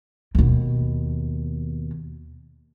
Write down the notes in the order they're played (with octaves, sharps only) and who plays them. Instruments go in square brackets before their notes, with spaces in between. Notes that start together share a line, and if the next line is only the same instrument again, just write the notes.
[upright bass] D#2 B2